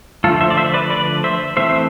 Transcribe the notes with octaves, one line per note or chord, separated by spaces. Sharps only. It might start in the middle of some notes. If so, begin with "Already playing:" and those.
D3 F3 A3 F4 A4
C5 E5
D5
C5 E5
B4 D5
B4 D5
C5 E5
E3 A3 C4 C5 E5